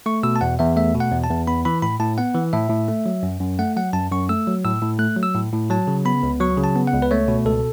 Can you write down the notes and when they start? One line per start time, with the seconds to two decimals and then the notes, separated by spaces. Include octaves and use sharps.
0.06 A3 C#6
0.23 B2 E6
0.36 A5
0.41 E2 F#5
0.59 E2 E5
0.76 A3 E5
0.94 B2
1.00 F#5
1.12 E2
1.24 A5
1.29 E2
1.47 B3 B5
1.65 E3 B5
1.82 A2 B5
2.00 A2 A5
2.18 B3 F#5
2.35 E3
2.53 A2 E5
2.70 A2
2.89 A3
3.06 F#3
3.23 F#2
3.40 F#2
3.59 A3 F#5
3.76 F#3 F#5
3.93 F#2 A5
4.11 F#2 C#6
4.29 A3 E6
4.47 F#3
4.65 A2 E6
4.82 A2
4.99 A3 F#6
5.17 F#3
5.23 E6
5.34 A2
5.53 A2
5.70 F#3 A5
5.87 C#3
6.05 B3 B5
6.23 C#2
6.40 F#3 C#6
6.58 C#3
6.64 A5
6.76 B3
6.87 F#5
6.93 C#2
7.02 B4
7.11 A3 C#5
7.28 B2
7.46 C#2 A4